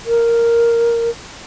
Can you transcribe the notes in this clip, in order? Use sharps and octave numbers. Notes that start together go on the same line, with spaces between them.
A#4